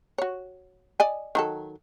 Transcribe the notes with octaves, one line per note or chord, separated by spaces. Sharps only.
F#4 C#5
D5 D#5 G#5
D#3 F#3 A4